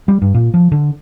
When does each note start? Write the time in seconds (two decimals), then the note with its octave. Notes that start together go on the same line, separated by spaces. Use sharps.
0.08 G3
0.22 G2
0.34 A#2
0.54 F3
0.72 D3